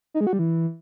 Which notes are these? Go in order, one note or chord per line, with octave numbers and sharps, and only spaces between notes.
D#4
G#3
F#4
G3
E3